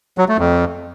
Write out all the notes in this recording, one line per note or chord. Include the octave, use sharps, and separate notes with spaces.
F#3
A3
F2